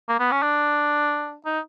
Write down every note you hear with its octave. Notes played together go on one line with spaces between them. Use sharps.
A#3
B3
C#4
D4
D#4